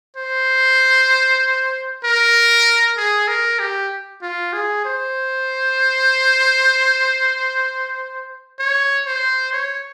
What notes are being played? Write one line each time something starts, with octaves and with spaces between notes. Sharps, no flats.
C5
A#4
G#4
A#4
G4
F4
G#4
C5
C#5
C5
C#5